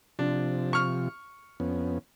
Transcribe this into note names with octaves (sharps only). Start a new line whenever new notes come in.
C3 F3 D4
C#6 F6
F2 B3 C#4